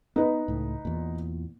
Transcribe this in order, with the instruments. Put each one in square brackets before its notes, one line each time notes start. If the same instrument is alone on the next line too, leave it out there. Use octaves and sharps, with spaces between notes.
[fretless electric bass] B3 [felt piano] D#4 B4
[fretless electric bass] C#2 A2
E2 A#2